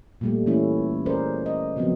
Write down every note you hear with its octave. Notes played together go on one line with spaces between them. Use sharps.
A#2 G3 A3
E3 A3 C#4 E4
C#4 E4 G#4 A#4 C5 D5
D#5
C#3 F3 F#3 B3 C4